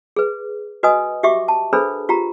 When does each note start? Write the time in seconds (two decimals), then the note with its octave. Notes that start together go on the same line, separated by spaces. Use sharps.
0.16 G#4 B4
0.83 F#4 B4 D#5 G#5 D#6
1.23 F#4 G4 E5 C#6 D6
1.48 A5
1.73 D4 G#4 A4 B4 C5 B5
2.09 F4 G4 A#5